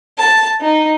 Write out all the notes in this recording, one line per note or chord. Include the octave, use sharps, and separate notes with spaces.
A5
D#4